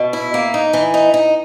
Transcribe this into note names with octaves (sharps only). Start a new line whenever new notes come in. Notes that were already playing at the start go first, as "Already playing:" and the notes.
Already playing: B2
E4
A#3
D#4
E3
D#4
D#4